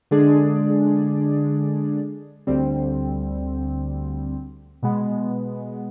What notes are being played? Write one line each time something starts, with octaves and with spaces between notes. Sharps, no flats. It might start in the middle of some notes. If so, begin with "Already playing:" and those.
D3 G#3 D4 G#4 D5
D2 D3 G3 C4
B2 G#3 B3